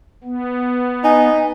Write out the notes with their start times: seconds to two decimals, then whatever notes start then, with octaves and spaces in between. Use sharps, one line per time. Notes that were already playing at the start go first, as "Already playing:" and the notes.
0.24 B3
1.04 D#4 G#5